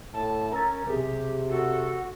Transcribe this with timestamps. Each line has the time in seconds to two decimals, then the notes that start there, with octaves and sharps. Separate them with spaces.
0.13 A2 A5
0.52 C#4 A#4 A#5 E6 A6
0.86 B1 C3 G4 G#4
1.50 F#4 A4